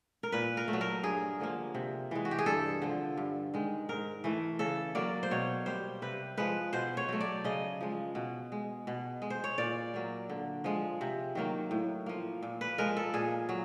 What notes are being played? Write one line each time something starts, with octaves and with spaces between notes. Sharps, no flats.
A#4
A#2 B4
A#4
A3
F#3
A#4
G2 G#4
D3 F3 A#3
C3
E3 G#3
F#4
G4
G#4
G2 A4
D3 F3
G2
D#3 G#3
G#2 A#4
E3 A3
C#3 A4
F#3 A#3 D5
C5
B2 C#5
G3 A#3 C5
C3 B4
F3 G#3 B4
B2 C5
C#5
F#3 A3
D5
C#3 D#5
F3 G#3
B2
G#3
B2
G#3
C5
C#5
A#2 D5
F#3 A#3
D3
F3 G#3
C3
D#3 F#3 A#3
A2
F3 A#3
A#2
B4
F3 G#3 A#4
A4
A#2 G#4
F#3